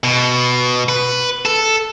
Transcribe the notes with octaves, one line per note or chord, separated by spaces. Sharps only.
B2
B4
A4